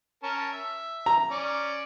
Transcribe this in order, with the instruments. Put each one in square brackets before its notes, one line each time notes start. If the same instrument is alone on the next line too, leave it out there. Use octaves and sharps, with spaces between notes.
[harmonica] C#4 A#4 A5
E5
[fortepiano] A#5
[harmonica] C#4 D5